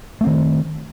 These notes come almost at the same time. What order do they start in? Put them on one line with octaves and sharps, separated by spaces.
A3 C4 D#3